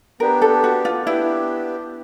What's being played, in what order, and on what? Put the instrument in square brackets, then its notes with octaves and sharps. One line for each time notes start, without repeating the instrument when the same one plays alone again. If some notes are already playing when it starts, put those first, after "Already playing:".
[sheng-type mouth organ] B3 D4 G4 [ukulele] A#4
[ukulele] A4
F#4
F4
[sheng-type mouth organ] B3 D4 G4 [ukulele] E4